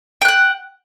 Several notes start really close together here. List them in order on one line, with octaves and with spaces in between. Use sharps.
G5 F#6 F#5